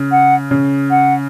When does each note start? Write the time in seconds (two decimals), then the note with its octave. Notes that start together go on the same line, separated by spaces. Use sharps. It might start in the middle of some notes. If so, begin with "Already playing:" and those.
Already playing: C#3
0.11 F#5
0.51 C#3
0.90 F#5